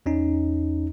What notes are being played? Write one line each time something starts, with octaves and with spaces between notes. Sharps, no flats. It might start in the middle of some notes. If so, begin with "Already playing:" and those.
E2 C#4 D#4